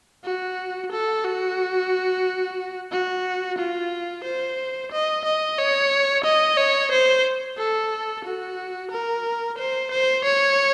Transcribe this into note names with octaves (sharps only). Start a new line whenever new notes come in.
F#4
A4
F#4
F#4
F4
C5
D#5
D#5
C#5
D#5
C#5
C5
A4
F#4
A#4
C5
C5
C#5